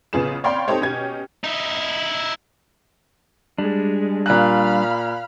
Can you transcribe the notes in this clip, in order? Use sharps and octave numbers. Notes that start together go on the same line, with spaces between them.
A1 C#3 B3 F4 G#4 E7
C#5 D5 F5 G5 B5 C6
C4 D#4 G4 A4 C5 C#5
B2 C#4 G4 G#6
D#4 E4
G3 G#3 D4
A#2 F5 B5 F6 F#6